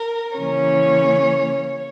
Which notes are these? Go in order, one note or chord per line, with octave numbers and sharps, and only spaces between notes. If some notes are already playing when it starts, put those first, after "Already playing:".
Already playing: A#4
C#3 E3 A#3 C#4 C#5